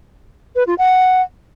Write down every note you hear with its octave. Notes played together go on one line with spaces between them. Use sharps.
B4
F4
F#5